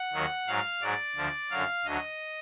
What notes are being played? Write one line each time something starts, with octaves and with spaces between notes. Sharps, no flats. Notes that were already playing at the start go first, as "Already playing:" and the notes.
Already playing: F#5
D#2 D#3 F#3
G#2 F#3 F5
G#2 F#3 D5
D2 D3 F3
F#2 D3 F#3 F5
D2 D3 F#3 D#5